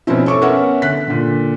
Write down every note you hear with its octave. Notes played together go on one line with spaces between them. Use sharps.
B2 F3 C4 C#4 E4
A4 C#5 C#6 D6
B3 C#4 A#4 C#5 E5 F#5
D3 F#6 B6
A#2 D3